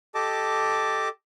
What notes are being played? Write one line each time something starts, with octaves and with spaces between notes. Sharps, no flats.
G4 A4 D#5 A5 D6